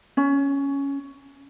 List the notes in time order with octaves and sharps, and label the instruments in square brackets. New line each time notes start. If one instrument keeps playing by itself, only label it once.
[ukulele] C#4